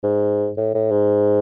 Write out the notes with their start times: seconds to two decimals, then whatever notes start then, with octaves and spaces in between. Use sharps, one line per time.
0.04 G#2
0.57 A2
0.74 A2
0.91 G#2